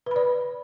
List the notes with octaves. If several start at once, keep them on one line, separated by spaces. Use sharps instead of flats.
B4 D5 B5